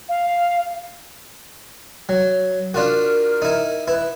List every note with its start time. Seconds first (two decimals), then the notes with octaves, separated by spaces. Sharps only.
0.08 F5
2.09 F#3
2.74 D4 F4 F#4 A#4
3.42 D#4 E4
3.88 E4 B4